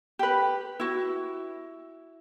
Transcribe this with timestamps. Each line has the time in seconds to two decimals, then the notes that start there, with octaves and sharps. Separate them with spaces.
0.19 G4 B4
0.80 E4 F#4